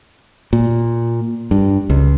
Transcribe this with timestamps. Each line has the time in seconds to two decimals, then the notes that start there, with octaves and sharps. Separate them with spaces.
0.53 A#2
1.51 G2
1.90 C#2